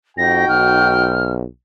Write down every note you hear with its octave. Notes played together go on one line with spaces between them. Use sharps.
F2 D#4 F#4 G5 A#6
B1 F6